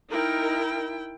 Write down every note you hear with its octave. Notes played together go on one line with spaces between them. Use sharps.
D#4 E4 A#4 G5